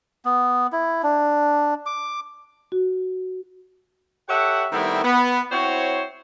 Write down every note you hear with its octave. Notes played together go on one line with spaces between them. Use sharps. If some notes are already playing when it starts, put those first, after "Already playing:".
B3
E4
D4
D6
F#4
G4 A4 C#5 E5 F#5
D#3 G3 A3 B3 C4 E4
B3
C4 E4 F#4 C5 C#5